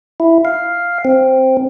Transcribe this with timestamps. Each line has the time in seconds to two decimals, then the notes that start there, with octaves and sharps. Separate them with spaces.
0.20 E4
0.45 F5
1.05 C4